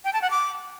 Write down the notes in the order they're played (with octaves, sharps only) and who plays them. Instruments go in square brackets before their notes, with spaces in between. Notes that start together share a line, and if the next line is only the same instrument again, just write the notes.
[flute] G5
A5
F#5
D6